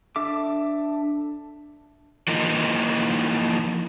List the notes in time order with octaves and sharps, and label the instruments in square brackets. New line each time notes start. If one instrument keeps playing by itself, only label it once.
[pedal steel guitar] D4 A4 E5 D6
[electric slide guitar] E3 F3 A#3 D#4